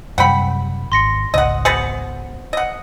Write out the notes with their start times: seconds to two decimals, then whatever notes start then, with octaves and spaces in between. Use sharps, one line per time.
0.18 F#2 C3 G3 F#5 G5 B5
0.92 G#1 C6 A#6 C#7
1.34 G#1 C#2 D#5 F#5
1.65 B3 F#4 G#4 C5 C#7 F#7
2.53 D#5 F#5